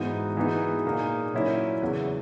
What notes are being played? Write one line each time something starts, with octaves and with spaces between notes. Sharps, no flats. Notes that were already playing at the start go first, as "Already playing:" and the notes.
Already playing: G#2 E3 B3 D#4 F#4
E3 G#3 B3 D#4 F#4
A#2 A#3 D#4 G#4
A#2 F#3 C#4 E4 A#4
E2 C#3 F#3